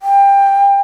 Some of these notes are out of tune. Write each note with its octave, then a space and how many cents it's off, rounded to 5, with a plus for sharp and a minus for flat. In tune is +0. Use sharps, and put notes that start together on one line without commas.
G5 +25